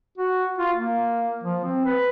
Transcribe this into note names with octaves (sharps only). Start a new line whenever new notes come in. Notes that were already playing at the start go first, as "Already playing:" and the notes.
F#4
F4
A#3
F3
C4
B4